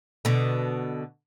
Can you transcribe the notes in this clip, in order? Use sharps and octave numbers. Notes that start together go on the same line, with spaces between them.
B2 D3